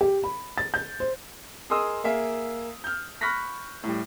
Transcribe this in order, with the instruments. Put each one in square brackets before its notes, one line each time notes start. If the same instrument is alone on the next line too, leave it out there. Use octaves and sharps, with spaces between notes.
[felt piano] G4
B5
A6
G6
C5
[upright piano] G#4 A#4 D#5 C6 D#6 E6
A#3 G#4 E5 F5
F6 G6
B5 C#6 F6 F#6 A#6 B6
A2 G3